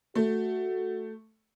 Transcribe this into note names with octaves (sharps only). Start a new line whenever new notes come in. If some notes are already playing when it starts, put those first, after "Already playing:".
A3 F#4